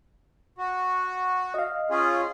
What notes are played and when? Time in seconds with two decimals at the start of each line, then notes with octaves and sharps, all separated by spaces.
0.58 F#4
1.54 D#5 F5
1.90 C#4 F4 G#4